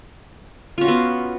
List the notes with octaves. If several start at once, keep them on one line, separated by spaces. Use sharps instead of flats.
B3 C#4 F4 F#4